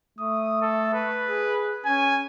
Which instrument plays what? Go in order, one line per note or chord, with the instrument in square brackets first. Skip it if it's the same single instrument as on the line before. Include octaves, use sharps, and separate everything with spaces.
[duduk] A3 [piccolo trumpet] D#6
[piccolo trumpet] A4
B4
[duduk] G#4
[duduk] C#4 [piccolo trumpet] G#5